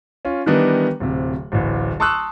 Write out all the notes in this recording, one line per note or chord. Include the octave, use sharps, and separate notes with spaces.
C#4 F4
D#3 E3 G3 B3 D4 D#4
D1 C3
D1 A1
A5 C6 C#6 D#6 E6 F#6